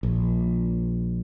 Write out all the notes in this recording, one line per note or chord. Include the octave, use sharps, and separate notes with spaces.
A#1